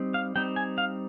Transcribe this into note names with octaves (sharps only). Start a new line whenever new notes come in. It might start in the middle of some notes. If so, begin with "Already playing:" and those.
Already playing: G3 C4 D#4
F5
G3 C4 D#4 G5
G#5
F5